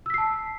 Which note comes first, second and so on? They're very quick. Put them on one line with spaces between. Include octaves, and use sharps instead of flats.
E6 B6 C7 A5